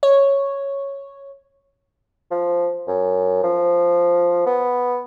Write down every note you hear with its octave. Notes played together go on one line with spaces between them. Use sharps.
C#5
F3
F#2
F3
B3